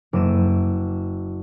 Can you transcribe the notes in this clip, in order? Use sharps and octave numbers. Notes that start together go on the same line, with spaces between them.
F#1 D6 E6 D#7 E7